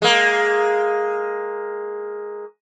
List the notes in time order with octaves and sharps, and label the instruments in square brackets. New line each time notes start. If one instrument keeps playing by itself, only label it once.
[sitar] G#3 A#3